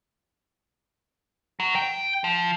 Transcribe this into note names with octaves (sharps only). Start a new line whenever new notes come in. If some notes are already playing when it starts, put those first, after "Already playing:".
F#3
G5
F3